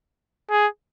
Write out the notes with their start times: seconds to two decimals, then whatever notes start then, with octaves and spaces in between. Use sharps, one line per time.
0.50 G#4